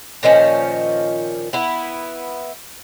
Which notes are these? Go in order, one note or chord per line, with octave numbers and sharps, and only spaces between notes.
A#2 D#3 F3 C#4
B3 E4